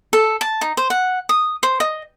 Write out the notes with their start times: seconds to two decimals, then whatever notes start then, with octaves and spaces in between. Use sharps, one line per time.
0.13 A4
0.41 A5
0.61 D#4
0.77 C5
0.90 F#5
1.29 D#6
1.63 C5
1.80 D#5